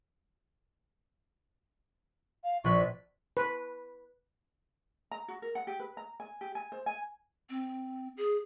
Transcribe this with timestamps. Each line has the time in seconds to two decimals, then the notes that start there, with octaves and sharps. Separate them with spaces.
2.44 F5
2.64 A#1 B4 C#6
3.37 B4
5.11 A#5
5.28 F#4
5.42 A#4
5.55 F#5
5.67 G4
5.80 B4
5.97 A#5
6.20 G#5
6.41 G4
6.55 G#5
6.72 C5
6.86 G#5
7.50 C4
8.17 G#4